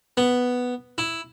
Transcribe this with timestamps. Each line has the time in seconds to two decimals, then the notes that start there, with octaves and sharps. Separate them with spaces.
0.17 B3
0.98 E4